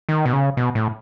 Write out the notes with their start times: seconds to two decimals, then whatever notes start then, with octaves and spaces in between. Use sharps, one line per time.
0.09 D#3
0.25 B2
0.33 C#3
0.57 B2
0.75 A2